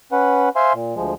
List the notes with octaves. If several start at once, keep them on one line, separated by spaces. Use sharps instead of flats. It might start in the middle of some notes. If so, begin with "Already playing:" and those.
C#4 B4 F#5
C5 E5 F5 G#5 C6
A#2
D2 F3 G#3